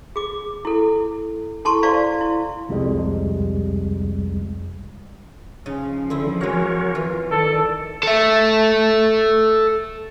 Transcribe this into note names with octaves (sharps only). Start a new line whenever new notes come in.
G#4 D6
E4 A4
E4 A4 A5 C6 C#6
E4 C5 D5 F5 C#6
E4
C2 F2 C3 G3 G#3
C#3 F3 D#4
D3 C4 E4
G#3 F#4 A#4 C#5 F#5
E3 F4
D#3 A4 D5
A4 E5